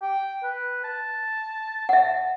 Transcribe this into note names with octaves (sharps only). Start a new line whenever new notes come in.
G5
B4
A5
E5 F#5